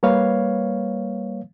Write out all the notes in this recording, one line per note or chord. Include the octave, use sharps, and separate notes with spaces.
G3 A#3 B4 C#5 F5